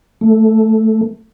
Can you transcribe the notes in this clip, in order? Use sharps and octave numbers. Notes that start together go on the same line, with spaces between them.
A3